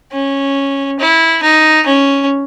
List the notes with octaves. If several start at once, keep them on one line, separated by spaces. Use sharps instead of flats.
C#4
E4
D#4
C#4